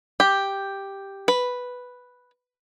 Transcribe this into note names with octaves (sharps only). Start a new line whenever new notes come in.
G4
B4